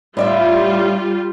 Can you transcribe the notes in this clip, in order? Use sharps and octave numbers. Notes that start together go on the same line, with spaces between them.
A2 G3 D4 F4 E5